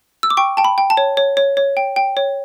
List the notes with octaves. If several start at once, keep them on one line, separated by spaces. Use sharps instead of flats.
E6
D6
G5 C#6
G5 A5
B5
G5
A5
C#5
C#5
C#5
C#5
G5
G5
C#5